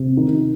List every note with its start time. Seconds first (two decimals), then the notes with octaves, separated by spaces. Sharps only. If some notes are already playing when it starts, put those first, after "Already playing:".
Already playing: C3
0.17 D#3